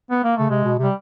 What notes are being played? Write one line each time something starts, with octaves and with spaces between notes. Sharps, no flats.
B3
A#3
C#3 A3
C3 G#3
B2
C3 G3